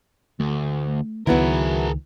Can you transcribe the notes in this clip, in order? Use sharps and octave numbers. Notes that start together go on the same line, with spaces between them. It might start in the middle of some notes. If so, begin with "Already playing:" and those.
D2 A3
C#2 D#3 F#3 B3 E4 G#4 A#4